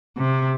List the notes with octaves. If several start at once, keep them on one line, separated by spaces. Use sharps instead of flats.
C3